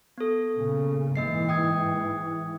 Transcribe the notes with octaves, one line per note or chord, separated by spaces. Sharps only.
B3 A4
A#2 C#3
G#2 E3 A#3 D#5 C7
G5 D#6 G#6